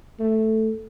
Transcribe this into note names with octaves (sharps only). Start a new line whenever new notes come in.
A3